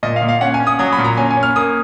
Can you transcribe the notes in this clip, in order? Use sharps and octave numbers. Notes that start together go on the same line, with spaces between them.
A#2 D#5
F5
A#2
F5
C#4 F#5
G#5
C#4
D#6
F#3 D#6
B5
A#2
A#5
C#4 G#5
G#5
C#4
F6
A#3 D#6